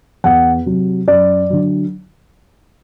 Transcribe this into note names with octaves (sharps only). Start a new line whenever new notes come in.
E2 F#5
C3 F#3
F#2 D5
D3 F#3